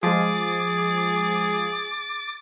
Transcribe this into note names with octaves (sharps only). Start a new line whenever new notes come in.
F3 G#3 G#4 D6 A6